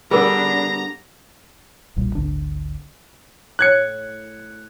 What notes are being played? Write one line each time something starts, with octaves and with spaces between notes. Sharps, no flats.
D3 G3 B3 D4 G#4 A#4 A#5
D#1 B1 A#2 G3
G#1 D2 D3 D4
A2 F#6 G#6 C#7